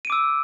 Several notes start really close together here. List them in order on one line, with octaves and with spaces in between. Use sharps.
D#7 D7 D6 E6